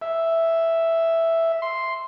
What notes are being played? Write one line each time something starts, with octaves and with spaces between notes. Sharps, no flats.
E5
C6